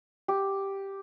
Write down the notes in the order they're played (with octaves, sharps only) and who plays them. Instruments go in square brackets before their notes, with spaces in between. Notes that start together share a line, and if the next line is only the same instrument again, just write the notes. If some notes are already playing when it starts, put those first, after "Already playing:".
[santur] G4